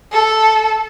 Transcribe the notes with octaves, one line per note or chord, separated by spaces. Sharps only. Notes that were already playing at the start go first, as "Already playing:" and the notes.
A4